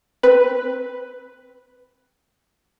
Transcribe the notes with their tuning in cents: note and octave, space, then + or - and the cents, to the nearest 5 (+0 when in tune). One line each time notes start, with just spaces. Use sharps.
C4 +0 B4 +5